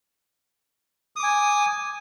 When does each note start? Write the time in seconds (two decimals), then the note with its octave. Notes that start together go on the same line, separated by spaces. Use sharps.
1.16 D#6
1.20 D6
1.23 G#5